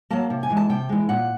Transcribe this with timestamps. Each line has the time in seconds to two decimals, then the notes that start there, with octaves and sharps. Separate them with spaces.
0.10 F#3 A#3 A5
0.30 C3
0.43 G#5
0.50 E3 G#3
0.57 A5
0.69 C3 G5
0.89 E3 G#3
1.09 A#2 F#5